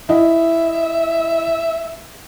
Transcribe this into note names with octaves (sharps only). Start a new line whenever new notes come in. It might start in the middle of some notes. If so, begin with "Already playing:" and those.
E4 D#5 E5